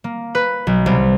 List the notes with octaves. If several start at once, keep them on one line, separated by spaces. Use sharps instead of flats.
A#3
B4
B1
C2